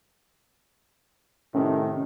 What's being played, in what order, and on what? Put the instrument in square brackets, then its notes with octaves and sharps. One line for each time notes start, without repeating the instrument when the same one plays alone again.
[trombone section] A2 C3 D#3 [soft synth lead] C#4